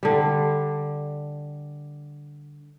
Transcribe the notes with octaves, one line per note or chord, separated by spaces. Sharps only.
D3 G3